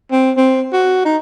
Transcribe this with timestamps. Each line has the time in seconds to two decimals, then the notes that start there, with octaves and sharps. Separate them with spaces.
0.11 C4
0.37 C4
0.73 F#4
1.05 D#4